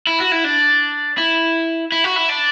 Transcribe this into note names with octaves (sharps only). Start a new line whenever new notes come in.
E4
F#4
E4
D4
E4
E4
F#4
E4
D4